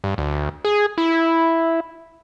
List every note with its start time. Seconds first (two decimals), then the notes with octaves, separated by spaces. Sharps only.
0.04 G2
0.18 D2
0.65 G#4
0.98 E4